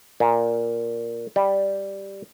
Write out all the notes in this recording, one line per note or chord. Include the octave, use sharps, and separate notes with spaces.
A#2
G3